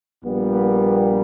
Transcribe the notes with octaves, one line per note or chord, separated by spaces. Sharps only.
A#1 A#2 G3 B3